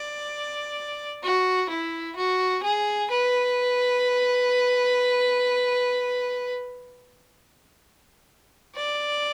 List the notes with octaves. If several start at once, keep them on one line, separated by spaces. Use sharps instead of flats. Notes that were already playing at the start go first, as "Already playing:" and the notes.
Already playing: D5
F#4
E4
F#4
G#4
B4
D5